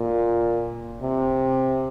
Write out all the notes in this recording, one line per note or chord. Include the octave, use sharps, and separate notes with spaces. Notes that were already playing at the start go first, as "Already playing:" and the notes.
Already playing: A#2
C3